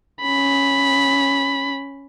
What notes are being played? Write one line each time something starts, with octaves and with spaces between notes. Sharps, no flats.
C#4 B5